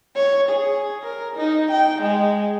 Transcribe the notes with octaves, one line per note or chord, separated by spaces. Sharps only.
C#5
G#4
A#4
D#4
G5
G#3